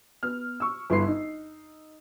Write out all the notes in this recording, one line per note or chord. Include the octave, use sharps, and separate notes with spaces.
B3 F6
C#6 E6
G1 E4 B4 C6 C7
D#4